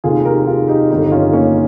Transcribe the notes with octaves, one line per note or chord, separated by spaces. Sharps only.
F1 D#2 D#3 F4 G#4
G4 A#4
F4 G#4
D#4 G4
G1 F2 D#3 D#4 G4
C#4 F4
A#3 C#4